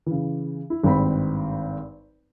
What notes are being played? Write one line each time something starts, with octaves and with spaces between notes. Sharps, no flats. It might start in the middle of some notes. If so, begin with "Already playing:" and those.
C#3 E3
E4
G#1 G2 C4 B5